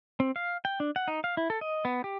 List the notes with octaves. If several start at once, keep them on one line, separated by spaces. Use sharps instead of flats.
C4
F5
G5
D4
F#5
D#4
F5
E4
A4
D#5
B3
G4